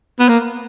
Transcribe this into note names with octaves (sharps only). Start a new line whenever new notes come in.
B3
A#3